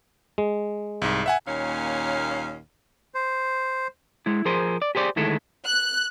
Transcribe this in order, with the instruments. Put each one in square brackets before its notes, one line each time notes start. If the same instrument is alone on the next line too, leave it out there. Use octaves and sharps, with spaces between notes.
[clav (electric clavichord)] G#3
[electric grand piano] C2 G#2
E5 F#5 G#5
[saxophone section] D#2 A#2 C#4 C#5 F5
[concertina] C5
[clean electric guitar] G#3 E4
F3 G#4 A#4 C5
D5
G4 G#4 C5 D5
D2 D#3 G#3 E4 A4
[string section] F#6